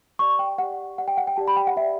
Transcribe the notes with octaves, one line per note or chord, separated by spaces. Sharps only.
G4 D5 C#6
G5
G4 D5 F#5
G4 D5 F#5
G5
F#5
G5
G4 D5 A5
B5
G5
F#5
G4 D5 E5